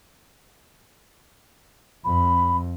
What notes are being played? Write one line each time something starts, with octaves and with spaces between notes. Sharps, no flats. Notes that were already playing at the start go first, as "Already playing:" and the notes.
F2 B5